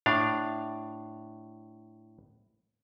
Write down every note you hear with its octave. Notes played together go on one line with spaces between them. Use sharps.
A2 D4 F5